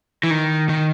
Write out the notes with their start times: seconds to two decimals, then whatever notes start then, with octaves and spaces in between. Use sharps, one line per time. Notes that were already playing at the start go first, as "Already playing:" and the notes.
0.23 E3
0.30 D#3
0.69 D#3